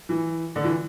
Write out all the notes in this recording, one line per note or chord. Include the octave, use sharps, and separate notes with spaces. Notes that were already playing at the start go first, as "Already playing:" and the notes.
E3
D3
E3